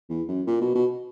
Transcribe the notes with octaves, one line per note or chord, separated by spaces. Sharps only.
E2
F#2
A#2
B2
B2